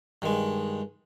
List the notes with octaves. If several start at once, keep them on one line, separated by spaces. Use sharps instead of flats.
G2 D#3 G#3